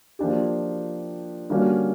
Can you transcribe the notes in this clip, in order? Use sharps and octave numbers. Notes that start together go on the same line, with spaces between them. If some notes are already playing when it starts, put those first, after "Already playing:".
F3 A#3 D4 G4
D3 G3 A#3 C#4 F#4